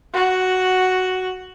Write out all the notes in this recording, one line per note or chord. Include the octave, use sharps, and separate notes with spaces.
F#4